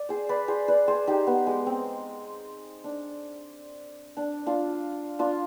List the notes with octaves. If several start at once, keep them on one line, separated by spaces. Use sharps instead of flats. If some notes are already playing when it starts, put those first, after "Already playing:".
Already playing: D5
G#4 C5
B4 D5
G#4 C5
B4 D5
G#4 C5
D#4 G4
B3
G#3
C4
D4
D4
D4 F4
D4 F4